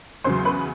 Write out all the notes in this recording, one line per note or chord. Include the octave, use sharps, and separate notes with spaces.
E2 C#3 F#3 C5 C6
B4 B5